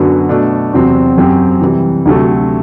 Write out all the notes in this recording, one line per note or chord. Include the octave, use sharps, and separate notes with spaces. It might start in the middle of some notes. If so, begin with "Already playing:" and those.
Already playing: F#2 D3 F#3 B3 F#4
B2 A3 D4
E2 C3 F#3 C4
F#2 F#3 C4 G4
C3 E3 G3
D2 C3 F#3 A3